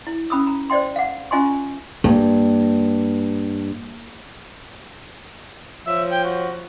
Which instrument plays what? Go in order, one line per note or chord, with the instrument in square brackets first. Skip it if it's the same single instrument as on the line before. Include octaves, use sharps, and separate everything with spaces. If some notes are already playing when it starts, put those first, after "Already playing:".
[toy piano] E4
C#4 B5 D#6 E6
A#5
C5 D5 D#5 G5 C6
F5 F#5
C#4 F4 D#5 G#5 C6 C#6
[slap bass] G2 [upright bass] A#3
[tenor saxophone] F3 [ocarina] C#5 [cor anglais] E5
[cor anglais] G5
F#4